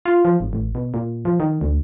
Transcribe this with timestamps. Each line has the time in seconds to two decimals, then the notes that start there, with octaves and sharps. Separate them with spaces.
0.05 F4
0.25 F3
0.40 G#1
0.53 A1
0.75 B2
0.94 A#2
1.25 F3
1.40 D#3
1.61 D2